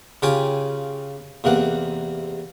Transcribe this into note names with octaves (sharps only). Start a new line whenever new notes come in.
C#3 F4 G4 C#5 G5 G#5
E2 C3 A#3 F#5